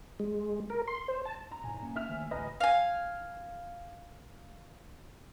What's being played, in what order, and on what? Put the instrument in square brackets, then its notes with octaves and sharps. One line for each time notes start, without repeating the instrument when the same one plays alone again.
[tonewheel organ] G#3
A#4
C6
C5
A5
[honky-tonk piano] A#5
[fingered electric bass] G#2 B2 [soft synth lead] G#5
[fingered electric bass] A#3 C#4
[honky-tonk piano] E5 F6 F7
[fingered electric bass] D#3 A3 A#3
[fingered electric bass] A1 D2 [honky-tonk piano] B4 D#5 A#5
[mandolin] F5 G#5